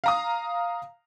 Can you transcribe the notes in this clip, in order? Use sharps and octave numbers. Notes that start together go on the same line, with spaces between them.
F5 A#5 D#6